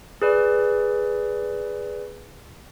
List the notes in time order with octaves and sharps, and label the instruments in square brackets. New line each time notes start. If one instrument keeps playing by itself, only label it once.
[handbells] G#4 B4 D5